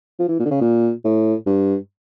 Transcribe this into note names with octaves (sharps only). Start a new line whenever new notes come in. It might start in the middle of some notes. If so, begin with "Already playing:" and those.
F3
E3
A#2
D3
C#3
A#2
A2
G2